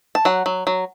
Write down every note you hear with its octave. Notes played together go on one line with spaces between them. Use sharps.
A5
F#3 F#5
F#3
F#3